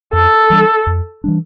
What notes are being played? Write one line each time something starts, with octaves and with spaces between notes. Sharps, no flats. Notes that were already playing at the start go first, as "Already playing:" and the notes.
F2 A4
E3 G3 D4
F2
E3 G3 D4